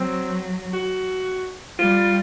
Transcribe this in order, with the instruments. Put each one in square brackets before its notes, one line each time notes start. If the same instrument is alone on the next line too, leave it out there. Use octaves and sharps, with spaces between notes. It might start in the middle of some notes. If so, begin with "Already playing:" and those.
Already playing: [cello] F#3 [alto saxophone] C4
[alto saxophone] F#4
[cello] G3 [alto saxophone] F4